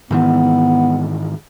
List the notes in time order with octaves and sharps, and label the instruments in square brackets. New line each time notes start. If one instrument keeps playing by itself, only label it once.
[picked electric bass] G#2 D#3 E3 [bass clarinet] B3